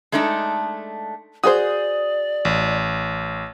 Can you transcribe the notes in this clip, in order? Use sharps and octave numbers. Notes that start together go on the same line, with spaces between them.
G#3 A3 D4 D#4 A4
F#4 G#4 C5 D5 D#6
A1